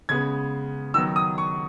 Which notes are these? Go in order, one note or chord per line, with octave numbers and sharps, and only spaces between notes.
C#3 G#3 B3 G#6
D#3 F#3 B3 E6
D#6
C#6